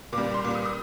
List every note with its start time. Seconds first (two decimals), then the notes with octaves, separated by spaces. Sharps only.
0.12 A#2 D6
0.18 G3
0.23 D6
0.34 C6
0.44 A#2 D6
0.48 G3
0.55 D#6
0.65 D#6